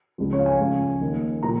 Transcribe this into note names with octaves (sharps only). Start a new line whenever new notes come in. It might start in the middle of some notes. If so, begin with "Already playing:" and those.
C#2 C#3 F3
C#5
F5
G#5
C#2 C#3 F3
D#2 D#3
A#2 F3 A#5